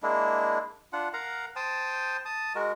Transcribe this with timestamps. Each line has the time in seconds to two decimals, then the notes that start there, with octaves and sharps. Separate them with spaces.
0.03 G#3 A#3 D4 E4
0.93 D4 F4 F#5
1.13 A#4 F5 F#5 A#5
1.56 C5 G5 A5 D#6
2.25 A5 D#6
2.55 G#3 F#4 A#4